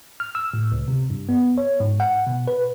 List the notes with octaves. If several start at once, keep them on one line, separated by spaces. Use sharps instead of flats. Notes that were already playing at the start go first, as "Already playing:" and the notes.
F6
E6
A2
C#2
C3
G2
B3
C#5
G#2
F#5
B2
B4